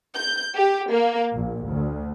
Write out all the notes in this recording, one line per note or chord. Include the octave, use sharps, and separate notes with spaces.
G6
G4
A#3
A#1
D2